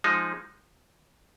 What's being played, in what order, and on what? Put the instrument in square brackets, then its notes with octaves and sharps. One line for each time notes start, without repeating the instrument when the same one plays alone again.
[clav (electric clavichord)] F3 G#3 D#4